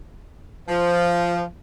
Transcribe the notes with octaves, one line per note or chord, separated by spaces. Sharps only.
F3